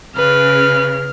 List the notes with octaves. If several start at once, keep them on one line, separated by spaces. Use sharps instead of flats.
C#3 B4 F6